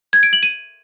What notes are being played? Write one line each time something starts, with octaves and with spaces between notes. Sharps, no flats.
G#6
D7
F#7
D#7